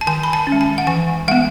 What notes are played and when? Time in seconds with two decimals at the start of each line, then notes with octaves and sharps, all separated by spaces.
0.01 A5
0.07 D#3 G#5
0.23 B5
0.33 A5
0.47 C#4
0.52 G#3
0.61 A5
0.78 F#5
0.87 E3 G#5
1.28 G#3 B3 F#5